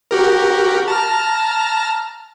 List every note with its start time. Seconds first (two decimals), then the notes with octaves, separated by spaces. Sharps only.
0.11 F#4 G4 A#4
0.88 A5 A#5 F6